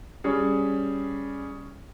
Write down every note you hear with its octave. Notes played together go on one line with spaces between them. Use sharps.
G3 C#4 G#4